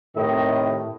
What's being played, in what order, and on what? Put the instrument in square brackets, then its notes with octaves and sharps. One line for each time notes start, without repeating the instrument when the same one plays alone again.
[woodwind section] A2 [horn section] C3 D#3 D#5